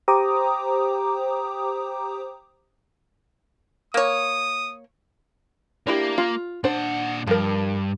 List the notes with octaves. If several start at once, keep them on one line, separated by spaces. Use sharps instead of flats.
G4 C5 G5 A#5 D6 D#6
A#3 C#5 D#6
A#3 D4 E4 G4
F4
A#2 D4 C5 F#5
G2 F3 A#4